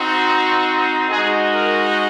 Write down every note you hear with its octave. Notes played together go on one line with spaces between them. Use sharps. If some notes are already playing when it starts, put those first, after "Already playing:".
Already playing: C4 D#4 F#4
G#3 D#4 F#4 G#4
A#4